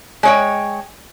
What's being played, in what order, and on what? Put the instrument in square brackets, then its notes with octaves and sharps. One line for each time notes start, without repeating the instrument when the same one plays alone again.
[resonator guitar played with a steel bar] G#3 C#5 G5